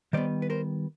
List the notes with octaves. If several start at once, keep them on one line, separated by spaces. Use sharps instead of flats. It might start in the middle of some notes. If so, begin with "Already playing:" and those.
D#3 G3 B3 C5 D5
B4
A#4 C5